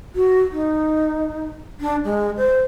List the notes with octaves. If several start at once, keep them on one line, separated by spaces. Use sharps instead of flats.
F#4
D#4
D4
G#3
C5